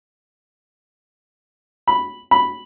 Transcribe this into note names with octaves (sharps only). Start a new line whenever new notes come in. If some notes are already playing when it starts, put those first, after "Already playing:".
B5
B5